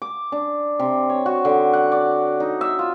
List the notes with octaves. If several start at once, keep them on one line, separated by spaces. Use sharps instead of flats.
D6
D4
C3
C#5
F#4
D3
F#5
D5
D#4
E5
F4